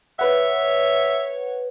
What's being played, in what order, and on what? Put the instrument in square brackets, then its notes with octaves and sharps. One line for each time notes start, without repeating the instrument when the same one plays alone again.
[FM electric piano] B4 F#5 [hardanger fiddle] C#5 [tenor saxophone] E5